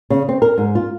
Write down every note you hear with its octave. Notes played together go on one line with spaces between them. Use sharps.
C#3
C4
A#4
G#2
F4